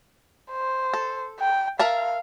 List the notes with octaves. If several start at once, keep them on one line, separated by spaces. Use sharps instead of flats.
C5
A4
G5
A#4 E5 F5 A5